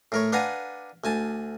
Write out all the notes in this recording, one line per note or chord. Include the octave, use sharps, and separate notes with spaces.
A2 A#4 C#5
D4 B4 F5 F#5 G#5 A#5
D2 G#5 A5